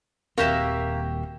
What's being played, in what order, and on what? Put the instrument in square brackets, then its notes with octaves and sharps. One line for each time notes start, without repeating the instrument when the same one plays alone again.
[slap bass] D#1 D#2 C4 [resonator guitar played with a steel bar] A#3 [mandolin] F#4 G4 E5